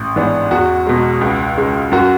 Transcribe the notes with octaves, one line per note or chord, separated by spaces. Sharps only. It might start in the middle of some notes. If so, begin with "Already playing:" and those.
Already playing: A1
G#2 E3 B3 D4
E2 F#4
B2 G#3
C#2
C#3 G#3
F#2 F#4